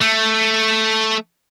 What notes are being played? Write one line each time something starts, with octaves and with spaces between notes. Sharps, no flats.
A3